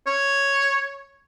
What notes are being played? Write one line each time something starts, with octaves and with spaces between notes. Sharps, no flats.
C#5